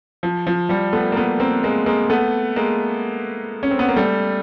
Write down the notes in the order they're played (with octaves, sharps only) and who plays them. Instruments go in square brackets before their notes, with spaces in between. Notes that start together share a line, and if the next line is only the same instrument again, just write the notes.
[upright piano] F3
F3
F3 G3
A3 B3
A#3
A3 B3
A#3 C4
G#3 A#3
G#3 A#3
A3 B3
G#3 A#3
C#4
C4
B3
A#3
G3 A3